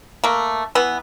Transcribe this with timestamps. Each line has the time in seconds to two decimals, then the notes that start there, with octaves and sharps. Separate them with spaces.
0.24 A3 A#3
0.75 E3 B3